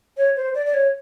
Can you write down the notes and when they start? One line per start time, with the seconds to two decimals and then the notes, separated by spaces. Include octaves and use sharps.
0.17 C#5
0.36 C5
0.55 D5
0.66 D5
0.74 C#5